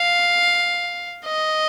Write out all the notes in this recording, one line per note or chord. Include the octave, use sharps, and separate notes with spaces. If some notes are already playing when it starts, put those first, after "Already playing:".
Already playing: F5
D#5